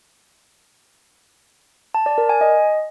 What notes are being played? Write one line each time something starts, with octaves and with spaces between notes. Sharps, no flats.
A5
D5
A#4
G#5
D#5